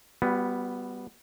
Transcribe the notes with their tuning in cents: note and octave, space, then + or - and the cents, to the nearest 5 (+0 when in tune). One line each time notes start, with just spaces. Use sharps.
G3 +0 B3 +0 F#4 -35